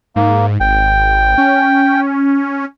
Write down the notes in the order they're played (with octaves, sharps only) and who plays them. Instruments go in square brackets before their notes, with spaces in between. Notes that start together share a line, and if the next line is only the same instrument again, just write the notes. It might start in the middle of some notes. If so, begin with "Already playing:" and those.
[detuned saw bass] G#2 [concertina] A#3
[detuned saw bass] G#1 [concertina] G5
[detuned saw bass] C#4